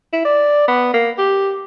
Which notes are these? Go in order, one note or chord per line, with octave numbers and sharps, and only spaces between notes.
E4
D5
B3
A#3
G4